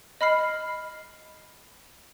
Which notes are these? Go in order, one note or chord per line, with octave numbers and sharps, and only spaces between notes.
D#5 B5 F6 C7